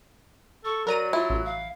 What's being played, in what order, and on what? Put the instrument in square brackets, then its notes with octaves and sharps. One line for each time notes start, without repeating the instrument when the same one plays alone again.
[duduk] A4 [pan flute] C#6
[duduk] F#3 [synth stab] A#4 A#5 D#7 [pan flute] D5
[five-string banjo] E4 [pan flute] F4
[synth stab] A1
[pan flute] F5